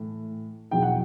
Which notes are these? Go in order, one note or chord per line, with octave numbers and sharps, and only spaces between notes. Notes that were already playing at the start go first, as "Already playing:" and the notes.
Already playing: A2 E3
E2 B2 F#3 G5
F#5